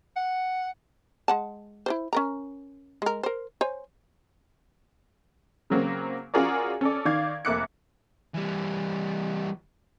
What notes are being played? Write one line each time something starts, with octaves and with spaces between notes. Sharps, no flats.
F#5
G#3 F#5 A5
E4 A4 C5
C#4 A#4 A#5
G#3 A#4
A#4 C5
C5 C#5 G#5
C#3 F#3 A#3 C4
C#4 F4 F#4 G#4 A#4 D5
C#4 A4 D5
D#3 D5 F5 G#6
F1 A#3 E5 D6 F#6 C#7
E3 G3